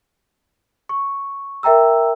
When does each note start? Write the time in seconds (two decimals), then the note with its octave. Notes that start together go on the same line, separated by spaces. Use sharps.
0.89 C#6
1.63 A#4 E5 G5 A#5 E6